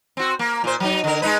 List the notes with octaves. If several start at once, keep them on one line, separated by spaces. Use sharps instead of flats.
C4 F#4
A#3
A#2 C5
F#3 D#4
D3 A#4
G#3 D#4 B4